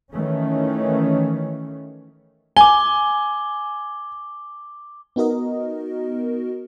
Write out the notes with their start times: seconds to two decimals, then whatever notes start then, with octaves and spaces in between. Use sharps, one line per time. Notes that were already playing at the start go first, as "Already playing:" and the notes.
0.11 D#3 E3 A3 C#4
2.57 G#5 D6 G7
5.16 B3 D#4 F#4 A#4 D#5